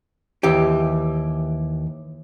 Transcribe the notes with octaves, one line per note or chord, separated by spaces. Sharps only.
D#2 E3 G4